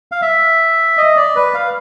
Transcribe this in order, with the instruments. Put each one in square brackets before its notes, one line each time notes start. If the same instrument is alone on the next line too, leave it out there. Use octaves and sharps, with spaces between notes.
[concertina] F5
E5
D#5
D5
B4
F5